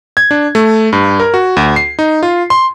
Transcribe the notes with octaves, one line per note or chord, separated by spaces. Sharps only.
G#6
D4
A3
G2
A#4
F#4
D2
C7
D#4
F4
C6